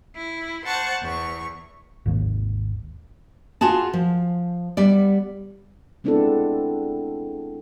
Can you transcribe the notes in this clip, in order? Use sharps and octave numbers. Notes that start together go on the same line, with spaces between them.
E4
C5 F#5 A5 C#6 F#6
E2 C#6
G#1 D#2
F4 F#4 G#4 A5
F3
G3 B3 D5
G#3 B3 C4 D4 E4 A4